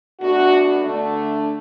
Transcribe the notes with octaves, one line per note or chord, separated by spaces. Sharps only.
B2 A3 D4 F#4
D3 A3 D4